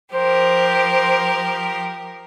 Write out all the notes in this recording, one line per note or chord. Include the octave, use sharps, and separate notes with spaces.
F3 G4 A#4 C5